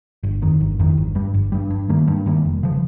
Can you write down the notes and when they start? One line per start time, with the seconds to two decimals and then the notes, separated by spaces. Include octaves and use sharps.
0.23 G1
0.42 F2 D#3
0.60 G1
0.79 F2 D#3
0.98 G1
1.15 G2 G3
1.34 G1
1.52 G2 G3
1.70 G2
1.89 D#3 G3 A#3
2.08 G2
2.26 D#3 G3 A#3
2.45 F1
2.63 C#3 F3